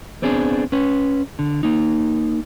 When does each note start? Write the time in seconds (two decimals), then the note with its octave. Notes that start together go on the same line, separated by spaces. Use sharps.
0.22 B3 C4 D4 G#4
0.72 C#4 B4
1.39 D3
1.63 A#3 D#4